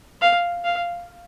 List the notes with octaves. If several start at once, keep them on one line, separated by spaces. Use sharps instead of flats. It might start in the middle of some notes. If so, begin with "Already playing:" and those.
F5
F5